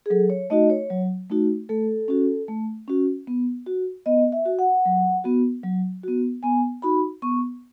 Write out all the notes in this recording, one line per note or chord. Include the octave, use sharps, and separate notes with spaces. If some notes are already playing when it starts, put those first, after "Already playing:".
G#4
F#3 A4
C#5
A3 D#4 F#4 D#5
C#5
F#3
A3 D#4 F#4
A3 A4
C#4 F#4
A3
C#4 F#4
B3
F#4
B3 D#5
E5
F#4
F#5
F#3
B3 F#4
F#3
B3 F#4
B3 G#5
D#4 F#4 B5
B3 C#6